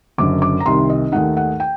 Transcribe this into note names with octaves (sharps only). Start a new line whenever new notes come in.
F#1 F#2 D3 D6
D6
A#5
C2 C3 D#3 C6
D#5
D#2 D#3 A3 D#4 F#5
F#5
G5